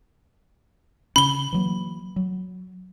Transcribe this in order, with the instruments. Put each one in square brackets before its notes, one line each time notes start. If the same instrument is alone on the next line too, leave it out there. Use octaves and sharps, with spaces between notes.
[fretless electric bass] C#3 C#4 [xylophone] B5 G7
[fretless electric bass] E3 F#3 A#3
F#3